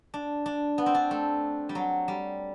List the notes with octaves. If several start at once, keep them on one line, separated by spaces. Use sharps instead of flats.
D4
D4
B3
C4
D4
A3
G3
F#3
G3